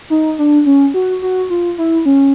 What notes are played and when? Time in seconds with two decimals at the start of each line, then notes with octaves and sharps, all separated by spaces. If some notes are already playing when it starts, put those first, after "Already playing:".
0.10 D#4
0.39 D4
0.66 C#4
0.94 F#4
1.22 F#4
1.50 F4
1.78 E4
2.05 C#4